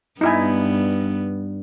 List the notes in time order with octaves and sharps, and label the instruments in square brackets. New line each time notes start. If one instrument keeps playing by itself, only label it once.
[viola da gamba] G2 B3 [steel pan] D#4 E4 G#5